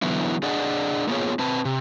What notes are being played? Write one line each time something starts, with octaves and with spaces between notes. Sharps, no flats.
D3 E3 F#3 B3 E4
D4 G#4 D5 D#5 F#5
A#3 B3 F4 G#4 C#5
C4 B4 A5
C3